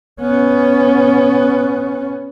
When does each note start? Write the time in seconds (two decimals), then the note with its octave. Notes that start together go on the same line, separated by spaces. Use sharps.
0.21 B3 C#4